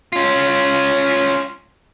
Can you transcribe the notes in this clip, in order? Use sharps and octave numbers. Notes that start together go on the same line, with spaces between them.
C#4 F4